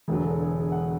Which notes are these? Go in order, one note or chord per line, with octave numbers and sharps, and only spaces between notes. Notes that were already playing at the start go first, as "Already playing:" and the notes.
E1 E2 D3 F#3 G#4
A4
G#4
G#4
F#5